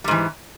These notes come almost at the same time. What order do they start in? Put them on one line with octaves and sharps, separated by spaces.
G3 G#2 E3